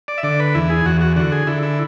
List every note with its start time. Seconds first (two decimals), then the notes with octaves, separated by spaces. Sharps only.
0.08 D5
0.18 E5
0.23 D3 D5
0.40 B4
0.55 E2 E4
0.70 G#4
0.86 E2 F#4
1.01 F#4
1.16 D3 F#4
1.32 G#4
1.47 D3 E4
1.63 E4